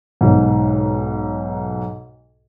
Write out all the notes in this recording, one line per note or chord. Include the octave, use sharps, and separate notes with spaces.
B1 G#2